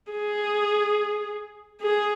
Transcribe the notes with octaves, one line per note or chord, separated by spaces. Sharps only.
G#4
G#4